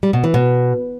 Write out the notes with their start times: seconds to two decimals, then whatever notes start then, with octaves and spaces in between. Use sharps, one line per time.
0.03 G3
0.13 B2
0.24 E3
0.34 B2